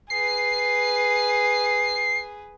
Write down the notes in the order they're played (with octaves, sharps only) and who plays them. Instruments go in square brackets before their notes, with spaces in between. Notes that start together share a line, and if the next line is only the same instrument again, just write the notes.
[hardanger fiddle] G#4 B4 [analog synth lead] C7